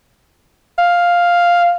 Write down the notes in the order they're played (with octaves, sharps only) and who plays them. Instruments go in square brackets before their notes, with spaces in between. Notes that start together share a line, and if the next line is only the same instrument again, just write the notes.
[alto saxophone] F5